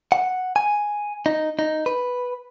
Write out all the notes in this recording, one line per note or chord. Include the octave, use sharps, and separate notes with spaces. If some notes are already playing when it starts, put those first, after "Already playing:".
F#5
G#5
D#4
D#4
B4